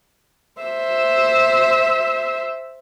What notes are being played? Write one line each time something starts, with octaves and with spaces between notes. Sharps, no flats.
C5 E5